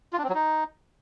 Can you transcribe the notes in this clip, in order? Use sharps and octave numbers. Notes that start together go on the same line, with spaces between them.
F4
D4
C4
F#3
D#4